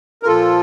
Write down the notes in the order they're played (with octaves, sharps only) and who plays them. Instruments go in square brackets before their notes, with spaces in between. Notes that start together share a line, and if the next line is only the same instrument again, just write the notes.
[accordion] A#4
A#2 F3 F4 A4